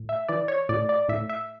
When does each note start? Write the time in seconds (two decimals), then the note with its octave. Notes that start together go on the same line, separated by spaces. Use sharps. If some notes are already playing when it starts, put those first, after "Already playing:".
Already playing: A2
0.09 E5
0.28 E3 D5
0.48 C#5
0.69 A2 D5
0.89 D5
1.09 A2 E5
1.29 E5